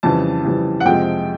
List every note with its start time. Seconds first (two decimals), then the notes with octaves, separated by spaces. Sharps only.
0.03 F2 C#3 E3 G3 A5
0.44 F2 C#3 E3 G3
0.80 F#5
0.85 F2 C3 F3 G#3 G5